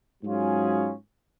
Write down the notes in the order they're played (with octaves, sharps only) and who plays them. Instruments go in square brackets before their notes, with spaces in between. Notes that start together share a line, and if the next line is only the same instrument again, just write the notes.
[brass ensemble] G#2 F#3 C#4 F4 G#4